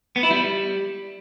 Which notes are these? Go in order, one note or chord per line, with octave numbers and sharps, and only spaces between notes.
B3
E4
G3